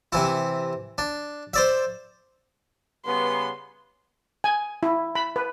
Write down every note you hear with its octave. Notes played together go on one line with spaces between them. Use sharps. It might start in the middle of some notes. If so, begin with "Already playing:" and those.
C3 E3 E4
D4
C5 D5 E5
C#3 G3 B3 C6
G#5
E4
B5
B4